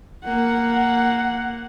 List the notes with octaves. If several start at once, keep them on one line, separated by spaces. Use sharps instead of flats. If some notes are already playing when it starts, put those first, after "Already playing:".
A#3 F#5